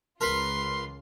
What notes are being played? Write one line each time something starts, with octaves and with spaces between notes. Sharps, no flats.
C#2 F4 A#4 B4 C6